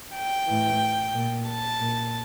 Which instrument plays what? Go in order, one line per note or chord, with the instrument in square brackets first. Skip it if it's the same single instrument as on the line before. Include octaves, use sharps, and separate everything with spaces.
[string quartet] G5
A2 E3
A#2
A5
A#2